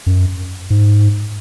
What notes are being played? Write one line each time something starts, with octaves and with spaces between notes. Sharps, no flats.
F#2
G#2